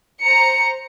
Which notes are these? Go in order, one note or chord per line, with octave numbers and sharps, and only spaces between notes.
C5 A#5 C#7